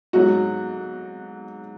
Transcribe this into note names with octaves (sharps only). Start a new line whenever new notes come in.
G#2 F#3 F#4